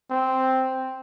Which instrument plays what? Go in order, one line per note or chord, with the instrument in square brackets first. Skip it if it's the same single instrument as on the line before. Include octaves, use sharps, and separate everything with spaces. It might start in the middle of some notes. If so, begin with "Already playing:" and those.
[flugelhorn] C4